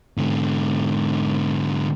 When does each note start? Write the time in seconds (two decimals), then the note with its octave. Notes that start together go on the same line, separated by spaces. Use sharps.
0.17 G#2 D3